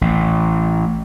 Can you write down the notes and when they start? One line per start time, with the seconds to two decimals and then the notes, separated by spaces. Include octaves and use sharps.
0.01 A1